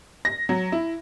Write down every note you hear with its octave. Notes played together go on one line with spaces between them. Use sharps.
A#6
F#3
E4